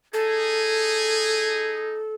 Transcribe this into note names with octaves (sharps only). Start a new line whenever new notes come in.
D#4 G#4 A4